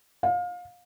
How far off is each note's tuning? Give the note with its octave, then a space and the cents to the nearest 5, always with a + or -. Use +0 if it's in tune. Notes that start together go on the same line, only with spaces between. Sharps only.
F5 +30